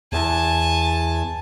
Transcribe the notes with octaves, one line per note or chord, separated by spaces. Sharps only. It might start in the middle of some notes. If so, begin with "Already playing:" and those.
E2 G#5 A5